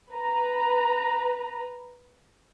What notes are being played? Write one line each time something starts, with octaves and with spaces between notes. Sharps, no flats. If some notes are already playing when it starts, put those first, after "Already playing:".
B4 A#5